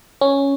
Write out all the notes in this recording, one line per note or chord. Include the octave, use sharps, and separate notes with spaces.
C#4